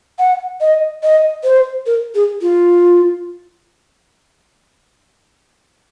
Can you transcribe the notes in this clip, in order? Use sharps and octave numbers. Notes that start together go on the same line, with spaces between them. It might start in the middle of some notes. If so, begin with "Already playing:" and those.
F#5
D#5
D#5
C5
A#4
G#4
F4